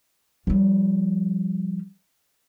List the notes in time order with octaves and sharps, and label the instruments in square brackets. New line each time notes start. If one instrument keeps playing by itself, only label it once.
[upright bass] F3 G3